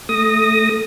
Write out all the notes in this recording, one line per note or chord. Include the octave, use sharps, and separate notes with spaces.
A3 D#6 A#6